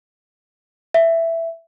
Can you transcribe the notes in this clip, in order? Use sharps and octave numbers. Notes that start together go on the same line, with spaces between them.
E5